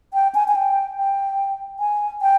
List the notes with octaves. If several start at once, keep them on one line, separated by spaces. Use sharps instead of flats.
G5
G#5
G#5
G5
G5
G#5
G5